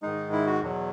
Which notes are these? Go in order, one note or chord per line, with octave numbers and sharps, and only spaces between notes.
G#2 D#3 G#3 D#4
E4
F#4
E2 B2 F#3